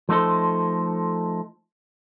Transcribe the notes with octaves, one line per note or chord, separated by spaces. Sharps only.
F3 A3 D#4 A4 C5